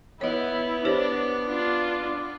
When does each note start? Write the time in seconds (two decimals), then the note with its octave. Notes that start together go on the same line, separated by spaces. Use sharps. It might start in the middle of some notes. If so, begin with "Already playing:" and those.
0.21 B3 E4 C#5 D#5
0.85 D4 G4 C5 C#5
1.46 D4 F4